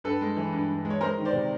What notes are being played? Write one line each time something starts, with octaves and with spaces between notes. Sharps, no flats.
G2 A4 B4
G#3
E3
G2
G2
G#3
C#5
G#3 A#4 C5
D#3
C5 D5
C3